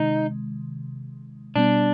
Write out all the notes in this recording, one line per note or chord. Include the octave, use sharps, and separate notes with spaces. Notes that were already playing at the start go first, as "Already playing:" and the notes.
Already playing: C3 D#3 G#3 D#4
B2 G3 B3 D4